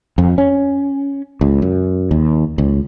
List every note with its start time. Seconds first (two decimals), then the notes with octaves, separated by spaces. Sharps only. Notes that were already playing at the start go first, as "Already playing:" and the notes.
0.18 F2
0.38 C#4
1.41 C#2
1.62 F#2
2.11 D#2
2.58 C#2